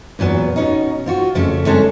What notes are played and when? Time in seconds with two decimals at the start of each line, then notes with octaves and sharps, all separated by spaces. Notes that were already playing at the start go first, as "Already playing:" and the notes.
0.19 E2 A#2 F#3 B3
0.56 B2 C#4 D#4
1.06 C4 F4 F#4
1.35 F2 C#3 A3
1.66 G3 G#3 C4 C#4 G#4 A4